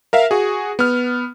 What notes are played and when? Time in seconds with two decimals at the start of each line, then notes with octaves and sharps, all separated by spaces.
0.13 A#4 E5 F5
0.31 F#4 G#4
0.79 B3 F6